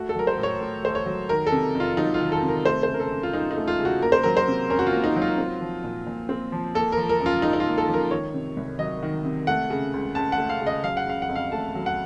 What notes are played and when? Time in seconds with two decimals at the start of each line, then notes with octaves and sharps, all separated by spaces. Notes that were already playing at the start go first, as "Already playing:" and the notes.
Already playing: A3 F#4
0.09 A4
0.16 F#3 A#4
0.27 C5
0.38 A2
0.43 C#5
0.61 A2
0.83 A3 C5
0.95 C#5
1.06 F#3
1.29 D#3 A#4
1.47 A4
1.52 C3
1.75 F2
1.80 F4
1.97 F#3 D#4
2.14 F4
2.21 D#3
2.32 A4
2.43 C3
2.48 A#4
2.65 A3 C5
2.83 C#3 C5
2.94 A#4
3.00 A4
3.11 F#2
3.23 F4
3.33 F#2 D#4
3.51 D#4
3.56 A3
3.68 F4
3.80 C#3
3.85 F#4
4.02 A#3 A#4
4.12 C5
4.23 F#3 A#4
4.37 C5
4.48 C3
4.70 C#4 A#4
4.79 F#4
4.87 F4
4.93 A#3
5.04 D#4
5.16 F#3
5.22 F4
5.38 C4
5.61 F3
5.84 A#2
6.07 A#2
6.29 C4
6.52 F3
6.75 A#3 A4
6.92 F3 A#4
7.09 A#4
7.20 F#2
7.26 F4
7.42 D#4
7.53 D#4
7.60 F4
7.66 A#3
7.78 A4
7.88 F3
7.94 A#4
8.11 D#3 C#5
8.34 C3
8.57 C2
8.79 F#3 D#5
9.03 D#3
9.24 C3
9.47 A3 F#5
9.70 C#3
9.94 C#2
10.15 C#2 A5
10.32 F#5
10.38 A3
10.50 F5
10.61 C#3
10.67 D#5
10.83 F#3 F5
10.97 F#5
11.07 C#3 F5
11.22 F#5
11.29 F2
11.36 F5
11.52 A3 A5
11.75 F#3
11.86 F#5